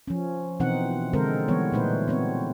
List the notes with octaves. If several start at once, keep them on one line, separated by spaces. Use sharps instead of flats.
F3 C#4
B2 E3 C4 D#4 F#5
D3 G#3 C4 A4 A#4 C5
E3 G3 B3 C#5
A#2 A3 D#4 B4 C5
B3 C4 C#5